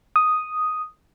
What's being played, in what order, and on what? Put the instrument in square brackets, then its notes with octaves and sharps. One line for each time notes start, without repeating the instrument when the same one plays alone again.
[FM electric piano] D#6